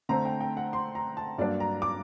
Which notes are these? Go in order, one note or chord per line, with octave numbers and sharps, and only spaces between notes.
D3 A3 C4 A#5
G5
G5
F#5
C6
A#5
A5
G2 F#3 A#3 D4 D5
A#5
D6